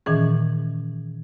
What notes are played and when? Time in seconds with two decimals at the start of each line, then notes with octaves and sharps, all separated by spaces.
0.06 A#2 D#3 E3 C#4 G#4